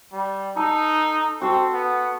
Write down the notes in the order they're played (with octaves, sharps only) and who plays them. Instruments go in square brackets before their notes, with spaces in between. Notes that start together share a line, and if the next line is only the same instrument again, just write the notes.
[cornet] G3
[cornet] D#4 [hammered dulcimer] A4
[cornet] C4 [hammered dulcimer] F#4 A4
[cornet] B3